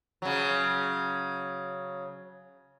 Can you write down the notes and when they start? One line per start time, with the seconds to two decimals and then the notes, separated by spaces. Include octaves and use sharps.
0.22 C#3 F#3